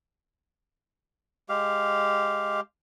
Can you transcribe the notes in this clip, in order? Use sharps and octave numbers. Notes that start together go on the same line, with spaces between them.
G#3 G4 F5